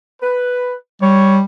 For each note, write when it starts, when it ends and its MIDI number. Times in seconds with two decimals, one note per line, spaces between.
0.22 0.74 71
1.02 1.42 55
1.02 1.37 73